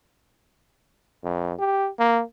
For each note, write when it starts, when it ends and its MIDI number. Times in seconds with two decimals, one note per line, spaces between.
1.24 1.53 41
1.59 1.88 67
1.99 2.21 58